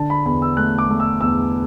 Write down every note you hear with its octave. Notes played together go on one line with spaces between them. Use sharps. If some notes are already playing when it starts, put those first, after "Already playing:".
Already playing: D3 A5
B5
E2 B5
E6
A3 F#6
D6
A3
E6
E2 E6